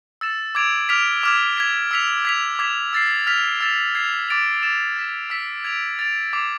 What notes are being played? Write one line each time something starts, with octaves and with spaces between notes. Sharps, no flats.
E6 A6 E7
D6 G#6 D7 F7
D6 F6 B6 D7 F7
D6 F6 G#6
G#6 B6 F7
E6 B6 F7
G#6 B6 F7
D6 G#6 B6
E6 A6 C7
F6 B6 F7
E6 A6 E7
G#6 C7 F7
D6 A6 D7 F7
D6 A6 E7
G#6 B6 E7
E6 B6 E7
G#6 D7 F7
A6 D7 F7
D6 G#6 C7 F7